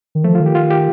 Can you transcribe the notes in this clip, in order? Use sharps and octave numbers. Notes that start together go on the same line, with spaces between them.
D#3
F3 A3
F4
D#3
G4
F4
G4